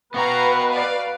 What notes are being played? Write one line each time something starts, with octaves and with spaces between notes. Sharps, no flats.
B3 F#4 B4 F5 G5 A#5
D5 F5